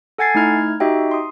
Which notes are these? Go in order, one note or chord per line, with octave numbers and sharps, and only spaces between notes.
A4 F#5 G#5 G#6 A6 C7
A3 D#4 E4 F6 G#6
D#4 F#4 G4 D#5 E5 G5
C6 D#6